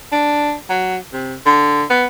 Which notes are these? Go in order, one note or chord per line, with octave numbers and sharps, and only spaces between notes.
D4
F#3
C3
D3
B3